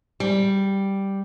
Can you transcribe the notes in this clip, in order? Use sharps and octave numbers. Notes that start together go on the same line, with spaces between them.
G3